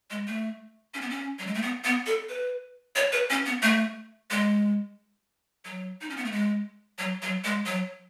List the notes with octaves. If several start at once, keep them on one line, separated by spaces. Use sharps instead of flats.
G#3
A3
C#4
B3
C#4
F#3
G#3
A3
B3
B3
A4
B4
C#5
B4
C#4
B3
A3
G#3
F#3
D#4
C#4
B3
A3
G#3
F#3
F#3
G#3
F#3